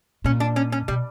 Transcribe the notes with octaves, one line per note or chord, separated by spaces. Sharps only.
A#2 C#4
D4
C#4
C#4
B2 G3